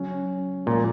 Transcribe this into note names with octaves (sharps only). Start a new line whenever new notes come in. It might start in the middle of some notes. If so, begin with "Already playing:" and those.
Already playing: C#3 F#3 C#4
A#2 F3 G#3